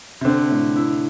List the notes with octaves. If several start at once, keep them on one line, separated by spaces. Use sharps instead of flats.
C3
D3 C4
A2
E4